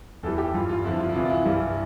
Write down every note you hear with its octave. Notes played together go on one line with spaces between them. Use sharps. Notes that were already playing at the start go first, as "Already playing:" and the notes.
E2 E3 G3 A4
G4
G2 E3 G3 F4
F4
F2 D3 F3 E4
F4
E4
C2 C3 E3 F4
F4
E4
G2 E3 G3